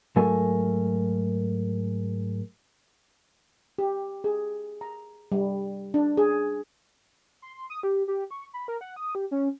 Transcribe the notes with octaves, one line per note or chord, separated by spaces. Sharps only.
G#2 F#3 A3 A4 A#4 G#5
G4
G#4
A#5
G3
D4
G#4
C6
C6
D#6
G4
G4
C#6
B5
A#4
F#5
D#6
G4
C#4